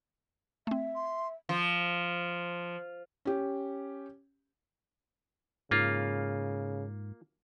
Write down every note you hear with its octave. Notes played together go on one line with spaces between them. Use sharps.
A3 C4 E5
C6
F3
C#4 G4
G#2 C#3 A#3 F4